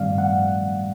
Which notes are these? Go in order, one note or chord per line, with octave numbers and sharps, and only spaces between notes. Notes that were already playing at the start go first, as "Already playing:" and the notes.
Already playing: G2 D#3 G3 C4 D5 F5
F#5